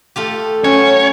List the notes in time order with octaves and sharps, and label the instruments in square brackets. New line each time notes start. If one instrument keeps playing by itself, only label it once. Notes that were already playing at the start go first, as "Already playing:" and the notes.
[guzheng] A3 F4 G4
[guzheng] F#3 [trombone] C#4 [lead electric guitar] C#5